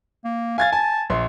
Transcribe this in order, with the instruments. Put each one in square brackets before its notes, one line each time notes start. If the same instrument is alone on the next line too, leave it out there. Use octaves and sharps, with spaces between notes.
[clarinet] A#3
[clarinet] F5 [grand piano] G#5 G#6 A6
[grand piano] G#5 [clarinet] A5
[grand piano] A#1 C6